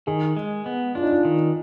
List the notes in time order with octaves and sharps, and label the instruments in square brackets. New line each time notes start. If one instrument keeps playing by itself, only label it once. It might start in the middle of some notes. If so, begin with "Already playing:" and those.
[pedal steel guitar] D#3 [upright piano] G#4
[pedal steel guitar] G#3
B3
[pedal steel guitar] D4 [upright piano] F4
[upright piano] D#4
F4
[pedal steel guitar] D#3